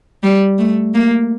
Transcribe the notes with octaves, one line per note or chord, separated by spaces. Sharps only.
G3
A3
A#3